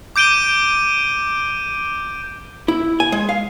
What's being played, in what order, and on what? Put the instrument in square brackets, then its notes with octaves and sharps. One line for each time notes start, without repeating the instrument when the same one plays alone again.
[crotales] D6 G6 D7 D#7 G7
[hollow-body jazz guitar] E4
G#5
G#3
F5